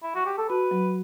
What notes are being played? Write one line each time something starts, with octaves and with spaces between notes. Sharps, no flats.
E4
F#4
G4
A4
F#4 B4
F#3